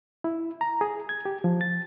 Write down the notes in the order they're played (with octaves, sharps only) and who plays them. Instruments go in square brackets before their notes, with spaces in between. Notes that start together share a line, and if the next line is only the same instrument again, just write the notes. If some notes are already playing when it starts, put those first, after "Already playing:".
[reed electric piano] E4
A#5
G#4
G#6
G4
F3
A6